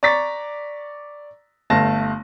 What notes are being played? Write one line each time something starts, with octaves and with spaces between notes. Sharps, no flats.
D5 A#5 C#6 A6 B6
G1 A3 F5 A5 A#6